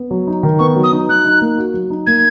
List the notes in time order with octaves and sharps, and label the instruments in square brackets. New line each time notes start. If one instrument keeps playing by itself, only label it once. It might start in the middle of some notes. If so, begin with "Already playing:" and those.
Already playing: [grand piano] B3
F#3
D#4
D#3
[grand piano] B3 [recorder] C#6
[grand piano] F#3
[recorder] D#6
[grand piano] D#4
[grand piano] F#3 [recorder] F#6
[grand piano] D#4
A#3
F#4
F#3
D#4
[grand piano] A#3 [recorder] G#6